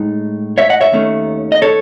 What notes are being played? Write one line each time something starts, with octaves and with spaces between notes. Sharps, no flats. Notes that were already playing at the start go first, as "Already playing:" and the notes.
Already playing: A2 G#3 D#4
C#5 E5
D#5 F#5
C#5 E5
D#2 D#3 A3 C#4
D#5
A4 C#5